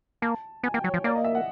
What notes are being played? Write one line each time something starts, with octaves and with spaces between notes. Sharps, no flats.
A#3 A5
B3 G#5
A#3 G5
F#3 C#5
F3 C#5
A#3 D5
D#5
E5
F#5